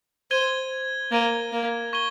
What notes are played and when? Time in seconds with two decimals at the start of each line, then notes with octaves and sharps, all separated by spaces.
0.31 C5 G#6 D#7 G7
1.12 A#3 G#6 D#7 G7
1.53 A#3
1.93 C#6 G#6 D#7 G7